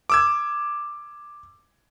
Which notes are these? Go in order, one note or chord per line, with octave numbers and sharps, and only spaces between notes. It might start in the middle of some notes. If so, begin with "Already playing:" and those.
D6 E6 G#6